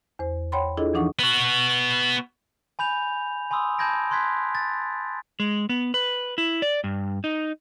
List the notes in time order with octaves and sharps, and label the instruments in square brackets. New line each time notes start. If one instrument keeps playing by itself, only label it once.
[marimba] E2 C5
C#5 F#5 G5 B5 C6
D4 E4 F4 G#4 A4 D#5
E3 F3 D4 D#4 F#5 C#6
[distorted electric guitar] B3 F#4
[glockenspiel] G#5 B5 G6 F7
G#5 B5 C6 D#6 E6
A5 B5 G6 G#6 A#6 D7
B5 C6 F#6 G#6 B6
A6
[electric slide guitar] G#3
B3
B4
E4
D5
G2
D#4